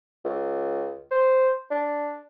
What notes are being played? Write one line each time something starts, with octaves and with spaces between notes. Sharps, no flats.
C#2
C5
D4